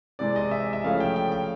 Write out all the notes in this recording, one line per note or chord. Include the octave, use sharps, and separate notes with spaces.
C3 E3 G#3 C4 D5
D#5
E5
E5
C#3 F3 A3 C#4 F5
G5
G5
G5